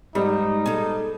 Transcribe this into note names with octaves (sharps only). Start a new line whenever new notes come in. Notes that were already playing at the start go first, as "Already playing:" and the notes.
G#2 G3 D#4
G#4 A4